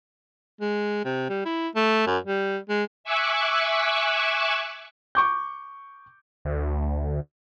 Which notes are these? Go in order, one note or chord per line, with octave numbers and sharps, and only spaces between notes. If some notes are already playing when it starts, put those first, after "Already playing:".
G#3
C3
G3
E4
A3
F#2
G3
G#3
E5 G#5 C#6 D6 E6 F#6
C#6 D6 G6
D2